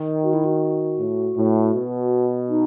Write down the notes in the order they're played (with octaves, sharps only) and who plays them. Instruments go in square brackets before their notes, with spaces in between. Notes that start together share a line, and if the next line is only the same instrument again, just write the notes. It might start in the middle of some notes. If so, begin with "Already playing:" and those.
Already playing: [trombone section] D#3
[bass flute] F#4
E4
F#4
[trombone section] A2
A2
B2
[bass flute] D#4